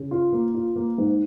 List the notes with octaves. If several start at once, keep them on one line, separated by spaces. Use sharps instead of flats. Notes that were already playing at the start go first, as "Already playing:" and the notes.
Already playing: C#3
F4
A#3
F4
A#3
G#2